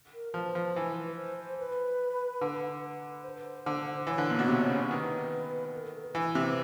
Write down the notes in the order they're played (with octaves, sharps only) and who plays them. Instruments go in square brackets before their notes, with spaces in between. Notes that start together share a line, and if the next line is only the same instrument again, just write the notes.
[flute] A#4
[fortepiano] F3 [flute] B4
[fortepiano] F3
E3
[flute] C5
C5
B4
[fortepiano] D3
[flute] B4
C5
[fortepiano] D3
[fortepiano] E3 [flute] C#5
[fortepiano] D3
A#2
B2
C3
C#3
[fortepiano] D#3 [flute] B4
[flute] A#4
A4
A4
B4
[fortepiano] E3
C3